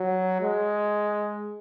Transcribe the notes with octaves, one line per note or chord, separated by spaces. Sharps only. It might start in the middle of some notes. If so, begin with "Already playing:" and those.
Already playing: F#3
G#3